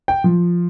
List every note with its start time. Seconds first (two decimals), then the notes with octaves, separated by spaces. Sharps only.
0.08 G5
0.24 F3